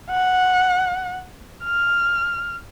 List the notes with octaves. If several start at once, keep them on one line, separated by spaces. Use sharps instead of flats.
F#5
F6